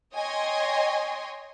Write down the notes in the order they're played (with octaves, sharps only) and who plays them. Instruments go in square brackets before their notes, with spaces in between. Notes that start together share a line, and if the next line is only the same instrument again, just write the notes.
[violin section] C#5 D#5 G5 G#5 C6